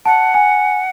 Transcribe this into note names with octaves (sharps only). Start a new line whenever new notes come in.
F#5 A5
G#5